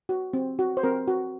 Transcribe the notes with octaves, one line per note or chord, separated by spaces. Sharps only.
F#4
C4
F#4
C5
C4 A#4
F#4